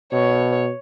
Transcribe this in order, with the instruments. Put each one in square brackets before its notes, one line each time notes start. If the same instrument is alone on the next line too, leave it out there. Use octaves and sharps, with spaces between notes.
[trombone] B2 [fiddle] C#5